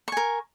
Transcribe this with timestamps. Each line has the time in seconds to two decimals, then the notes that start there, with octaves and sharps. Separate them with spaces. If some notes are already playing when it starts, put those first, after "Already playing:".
0.08 C#6
0.12 G#5
0.17 A#4